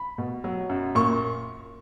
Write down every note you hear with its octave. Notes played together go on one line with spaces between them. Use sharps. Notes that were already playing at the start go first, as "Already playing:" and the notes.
Already playing: B5
B2
F#3
F#2
A#2 C#6